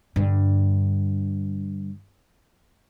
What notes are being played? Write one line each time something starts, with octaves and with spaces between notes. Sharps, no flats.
G2 D3